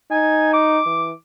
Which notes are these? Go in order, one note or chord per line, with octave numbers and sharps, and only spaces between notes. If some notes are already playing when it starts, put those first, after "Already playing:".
D#4 G#5
D6
E3